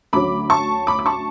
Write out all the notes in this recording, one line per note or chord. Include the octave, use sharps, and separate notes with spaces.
D2 D3 F#3 C#4 B5 D6
A5 C#6
B5 D6
D6
A5 C#6